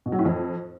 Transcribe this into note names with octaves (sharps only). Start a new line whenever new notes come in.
B2
F#3
A2
F2